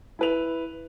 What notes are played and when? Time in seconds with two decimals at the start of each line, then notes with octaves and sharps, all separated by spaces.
0.19 E4 B4 F7